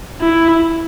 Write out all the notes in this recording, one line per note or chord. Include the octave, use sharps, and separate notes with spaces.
E4